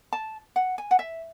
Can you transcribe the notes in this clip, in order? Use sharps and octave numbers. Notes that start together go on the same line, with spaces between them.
A5
F#5
G#5
F#5
E5